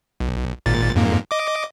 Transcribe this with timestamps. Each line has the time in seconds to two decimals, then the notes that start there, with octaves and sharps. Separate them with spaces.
0.20 B1
0.66 G#1 A#2 A6
0.95 F2 G#2 A#3
1.31 D#5 D6